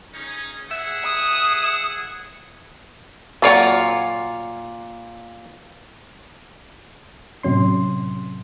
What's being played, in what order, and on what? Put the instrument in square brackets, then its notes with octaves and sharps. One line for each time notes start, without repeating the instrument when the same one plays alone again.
[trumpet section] C#4 D#4 G#4
[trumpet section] G#4 F#5 [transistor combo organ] E5
[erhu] D#6
[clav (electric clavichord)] A#2 F4 C#5 [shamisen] F#3 D5 F#5
[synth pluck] A2 C3 F#3 C#4 C6